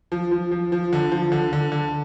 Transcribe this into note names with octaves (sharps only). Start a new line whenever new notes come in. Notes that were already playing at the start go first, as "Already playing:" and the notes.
F3
F3
F3
F3
D3
F3
D3
D3
D3